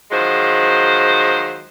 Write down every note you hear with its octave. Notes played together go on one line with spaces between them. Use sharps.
D#3 F3 F#3 G#3 C5